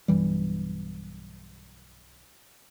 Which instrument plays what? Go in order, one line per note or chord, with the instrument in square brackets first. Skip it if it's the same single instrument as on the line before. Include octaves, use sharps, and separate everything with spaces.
[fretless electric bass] B1 G2 E3 G3